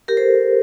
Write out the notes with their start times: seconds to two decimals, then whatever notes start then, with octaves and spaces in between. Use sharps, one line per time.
0.08 G4 A#4
0.17 A4 C5